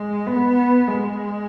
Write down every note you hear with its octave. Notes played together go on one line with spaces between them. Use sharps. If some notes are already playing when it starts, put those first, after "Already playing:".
Already playing: G#3
B3
G#3